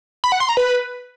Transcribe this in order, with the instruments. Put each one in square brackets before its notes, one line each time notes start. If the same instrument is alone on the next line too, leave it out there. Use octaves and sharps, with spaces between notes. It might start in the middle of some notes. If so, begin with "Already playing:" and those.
[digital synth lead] B5
F#5
C6
A#5
B4